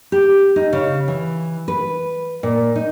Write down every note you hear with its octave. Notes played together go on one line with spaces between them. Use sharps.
G4
D#4
C#3
E3
B4
A#2
D#4